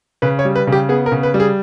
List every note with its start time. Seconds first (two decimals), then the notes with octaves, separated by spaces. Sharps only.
0.22 C#3 B4
0.39 C#5
0.45 G3
0.56 B4
0.67 C#3
0.72 G4
0.89 B3 G#4
1.06 A#4
1.12 C#3
1.23 B4
1.34 G3
1.40 G#4